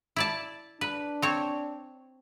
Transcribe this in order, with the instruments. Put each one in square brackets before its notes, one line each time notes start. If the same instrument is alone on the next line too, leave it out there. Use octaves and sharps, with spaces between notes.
[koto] E4 D5 A5
[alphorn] D4 [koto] B4
[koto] C4 C#5